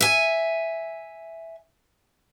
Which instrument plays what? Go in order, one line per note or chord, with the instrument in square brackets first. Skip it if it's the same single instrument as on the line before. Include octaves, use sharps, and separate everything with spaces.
[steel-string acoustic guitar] E5 G#5